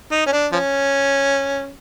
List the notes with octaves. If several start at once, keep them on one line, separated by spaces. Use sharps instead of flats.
D#4
C#4
D4
F3 C#4